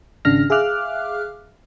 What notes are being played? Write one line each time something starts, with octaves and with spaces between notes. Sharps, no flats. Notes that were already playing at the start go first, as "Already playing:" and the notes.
G#1 C#3 D4 F6 A#6
G#4 E5 F5 D6 F6 F#6